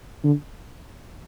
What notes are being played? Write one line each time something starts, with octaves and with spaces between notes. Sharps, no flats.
D3